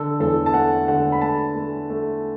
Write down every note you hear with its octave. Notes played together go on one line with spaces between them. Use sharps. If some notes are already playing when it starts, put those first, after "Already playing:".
Already playing: D3 A4
E2 A4
A5
A3 F#5
D3 F#5
B5
A3 A5
A3
A3